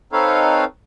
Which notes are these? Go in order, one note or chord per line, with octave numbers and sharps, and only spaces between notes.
C4 D#4 A4 B4 C#5 F5